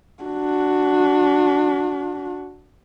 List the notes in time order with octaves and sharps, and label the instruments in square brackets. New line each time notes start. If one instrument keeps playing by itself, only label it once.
[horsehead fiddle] D4 F#4